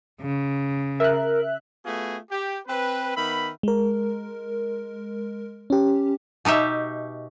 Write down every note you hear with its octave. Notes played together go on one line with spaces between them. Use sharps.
C#3
A#4 E5 F#6
A3 B3 F4 F#4 G#4
G4
C4 B4
D#3 B3 E5 B5
G#3 A#4
C#4 G4
B2 D#4 G4 E5